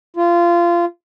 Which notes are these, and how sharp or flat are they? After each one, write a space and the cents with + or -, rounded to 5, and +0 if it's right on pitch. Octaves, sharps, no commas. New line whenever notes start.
F4 -20